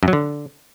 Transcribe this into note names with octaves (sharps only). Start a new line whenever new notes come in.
F#2
F#3
D3